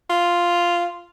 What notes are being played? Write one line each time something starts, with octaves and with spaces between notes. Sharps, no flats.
F4